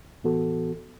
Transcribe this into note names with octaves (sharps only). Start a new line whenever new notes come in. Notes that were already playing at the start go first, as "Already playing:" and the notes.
A2 E3 B3 F#4 A4